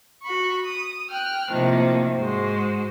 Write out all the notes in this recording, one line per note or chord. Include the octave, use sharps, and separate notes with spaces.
F#4 B5 C#6
D#6
G5 F6 F#6
A2 C3 D#3 F3 A#3
G#2 G#3 F#4 C5